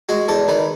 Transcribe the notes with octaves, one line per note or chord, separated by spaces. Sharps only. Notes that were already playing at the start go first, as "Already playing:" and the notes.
G#3 F#4
E2 A4
D#3 B4